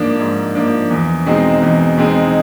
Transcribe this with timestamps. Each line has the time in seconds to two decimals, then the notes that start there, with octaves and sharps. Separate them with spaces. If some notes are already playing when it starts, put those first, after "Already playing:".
Already playing: G#2 F3 A#3 D4
0.20 G#2
0.55 F3 A#3 D4
0.91 E2
1.26 B2 G#3 C4 D#4
1.62 E2
1.97 B2 G#3 C4 D#4